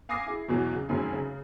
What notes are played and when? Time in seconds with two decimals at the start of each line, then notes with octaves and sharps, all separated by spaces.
0.09 F5 G#5 D6 D#6 A#6 C7
0.26 E4 G#4
0.48 E2 B2 E3 F#3
0.73 C#3
0.89 F1 F#2 D#3 C4 G#4 G#5
1.13 C#3